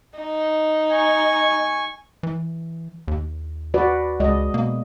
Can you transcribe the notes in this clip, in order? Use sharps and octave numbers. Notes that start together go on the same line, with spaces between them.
D#4
G#5 C#6
E3
D#2
F#4 B4 D5
C#2 G#3 D5 D#5
B2 A#3